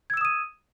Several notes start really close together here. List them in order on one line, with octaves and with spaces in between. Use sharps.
G#6 E6 E7 D#6 D#7